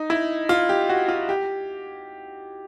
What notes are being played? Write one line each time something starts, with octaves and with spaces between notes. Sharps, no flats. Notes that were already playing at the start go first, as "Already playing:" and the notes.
Already playing: D#4
E4
F4
G4
F#4
F4
G4